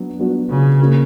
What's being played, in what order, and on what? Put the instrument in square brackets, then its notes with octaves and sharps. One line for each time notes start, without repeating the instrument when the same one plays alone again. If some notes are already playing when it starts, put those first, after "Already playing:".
Already playing: [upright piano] F#3 B3 D4
F#3 B3 D4 F#4
[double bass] C#3
[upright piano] A#3 C#4 F#4 A#4